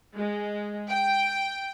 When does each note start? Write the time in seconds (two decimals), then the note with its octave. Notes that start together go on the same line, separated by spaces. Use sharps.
0.16 G#3
0.89 G5